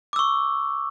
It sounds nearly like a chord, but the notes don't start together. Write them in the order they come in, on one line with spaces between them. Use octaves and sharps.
D6 E6 C#6